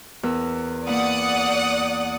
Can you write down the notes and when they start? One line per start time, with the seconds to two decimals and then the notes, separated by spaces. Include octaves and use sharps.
0.23 E2 A#4 E6
0.87 A#3 E4 D5 F#5 D#6